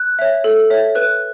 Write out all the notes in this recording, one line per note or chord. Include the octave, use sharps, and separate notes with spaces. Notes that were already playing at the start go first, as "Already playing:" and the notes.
Already playing: F#6
C#5 E5
A4
C#5 E5
B4 F#6